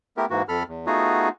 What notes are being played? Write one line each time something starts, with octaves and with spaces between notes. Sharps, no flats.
A3 B3 E4 G4 A#4
G#2 E3 A#3 F#4
F2 A4 B5 F6
E2
A3 B3 D#4 F4 F#4 G#4